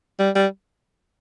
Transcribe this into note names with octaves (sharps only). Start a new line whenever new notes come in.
G3
G3